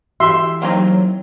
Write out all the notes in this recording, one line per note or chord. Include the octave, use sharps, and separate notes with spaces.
E3 F#4 G4 E5 C6
F#3 A#3 C4 D#4